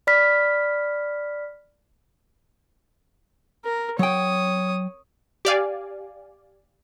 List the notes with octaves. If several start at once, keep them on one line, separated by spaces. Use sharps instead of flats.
D5 B5 F6 B6
A#4
F#3 C#5 G5 D#6
G4 D5 F5 G#5